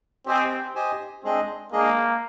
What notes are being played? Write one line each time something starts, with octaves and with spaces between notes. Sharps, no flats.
C4 G4 C5 D#5 G#5
G4 C5 D#5 G#5
G#3 C4 D4 G#4 D#5
G#3 A#3 D4 G#4 D#5